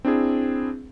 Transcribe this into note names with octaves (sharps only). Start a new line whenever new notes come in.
C4 D4 E4 G#4